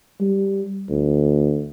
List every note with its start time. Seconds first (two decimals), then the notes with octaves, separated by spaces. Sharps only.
0.20 G3
0.90 D2